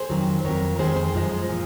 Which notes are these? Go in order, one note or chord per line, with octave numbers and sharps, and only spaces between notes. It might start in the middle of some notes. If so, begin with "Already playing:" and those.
Already playing: G#4 C5
F2 D#3 F#3
F2 C3 F#3 A#4 C#5
F2 D#3 G#3 G#4 C5
G#4 C5
F#2 F3 G#3
A#2 F3